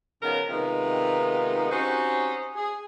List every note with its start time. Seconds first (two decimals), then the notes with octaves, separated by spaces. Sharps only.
0.22 C#3 F3 B3 C#4 D#4 A#4
0.49 C3 D#3 G#3 B3 D#4 F4
1.71 C4 C#4 D#4 F#4 G4 C5
2.56 G#4